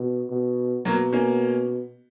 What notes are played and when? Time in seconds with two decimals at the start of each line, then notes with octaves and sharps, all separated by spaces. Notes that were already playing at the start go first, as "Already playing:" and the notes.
Already playing: B2
0.31 B2
0.85 B2 F#3 A#3
1.13 A#3 C#4